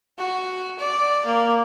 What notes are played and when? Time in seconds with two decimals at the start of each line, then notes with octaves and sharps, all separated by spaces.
0.19 F#4
0.80 D5
1.26 A#3